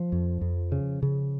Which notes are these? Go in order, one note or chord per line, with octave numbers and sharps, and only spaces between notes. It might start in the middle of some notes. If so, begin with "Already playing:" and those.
Already playing: F3
F2
F2
C#3
C#3